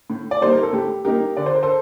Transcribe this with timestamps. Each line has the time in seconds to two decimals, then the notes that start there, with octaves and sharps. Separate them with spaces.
0.10 A2
0.31 D5
0.41 G3 A#3 D#4 C5
0.53 A#4
0.63 A4
0.73 A2 G4
1.05 G3 A#3 D#4 G4 A#4
1.37 D3 D5
1.46 C5
1.55 A#4
1.63 A4 C5